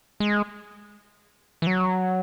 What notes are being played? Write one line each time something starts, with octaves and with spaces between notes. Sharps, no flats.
G#3
E3
F#3